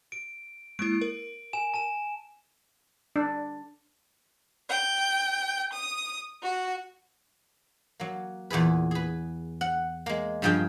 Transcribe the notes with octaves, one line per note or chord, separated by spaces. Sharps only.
D7
G#3 A#3 E4 D7
A#4
G#5 E7
A5 E7
D4
G5
D#6
F#4
F#3 A#3
E2 A#2 G#4 B4
G#4 B4
F#5
G#3 A#3
G2 C#3 F3 G#4 G5